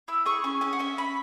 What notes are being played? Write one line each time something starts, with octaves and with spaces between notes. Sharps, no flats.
E4 E6
G#4 C#6
C#4 G#5
C#4 G#5
F#5
C#4 E5
C#4 B5